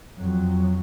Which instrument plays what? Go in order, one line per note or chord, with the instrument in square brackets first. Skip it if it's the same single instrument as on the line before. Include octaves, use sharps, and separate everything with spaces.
[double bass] F2 F#3